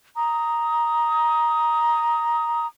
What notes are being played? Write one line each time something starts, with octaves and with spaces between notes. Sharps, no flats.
A#5 D#6